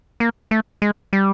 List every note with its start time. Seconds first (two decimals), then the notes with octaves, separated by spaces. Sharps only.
0.20 A#3
0.51 A3
0.82 G#3
1.13 G3